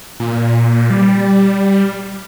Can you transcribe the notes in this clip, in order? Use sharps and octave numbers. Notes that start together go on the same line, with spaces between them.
A#2
G3